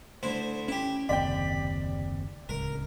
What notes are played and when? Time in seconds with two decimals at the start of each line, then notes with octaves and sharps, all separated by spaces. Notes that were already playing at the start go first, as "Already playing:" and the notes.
0.23 D2 E4 C5
0.68 C#4 E4 G4
1.09 F#1 D#2 C3 D5 G5 B5
2.49 D1 C#2 A#4